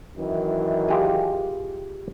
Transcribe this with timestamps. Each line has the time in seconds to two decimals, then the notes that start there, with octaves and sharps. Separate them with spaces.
0.17 F#2 D#3 E3
0.89 F4 G4 G#4